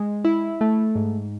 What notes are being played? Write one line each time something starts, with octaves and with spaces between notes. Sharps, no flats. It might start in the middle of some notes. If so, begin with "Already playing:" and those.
Already playing: G#3
E4
A3
G#2